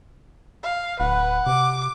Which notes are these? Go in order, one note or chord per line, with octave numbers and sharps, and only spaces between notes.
F5
D1 B4 F#5
C3 D6